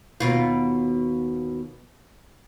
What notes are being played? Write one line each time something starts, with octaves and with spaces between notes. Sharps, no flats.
D#2 B2 F4